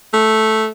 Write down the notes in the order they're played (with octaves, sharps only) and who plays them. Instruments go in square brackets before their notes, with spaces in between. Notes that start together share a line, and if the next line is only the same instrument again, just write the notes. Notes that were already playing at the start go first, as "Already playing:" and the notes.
[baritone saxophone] A3